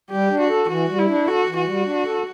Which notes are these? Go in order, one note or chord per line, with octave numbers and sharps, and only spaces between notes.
G3 G4
D4
F#4
A4
E3 F#4
G3
E4
D4
F#4 A4
E3
F#4
G3
D4
A4